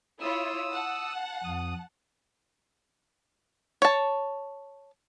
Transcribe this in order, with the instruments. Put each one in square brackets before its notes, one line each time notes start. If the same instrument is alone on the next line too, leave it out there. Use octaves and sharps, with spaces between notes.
[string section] E4 F4 C#5 [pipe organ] D#6 E6
[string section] F#5 A5
[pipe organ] F2 D#6
[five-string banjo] C#5 A5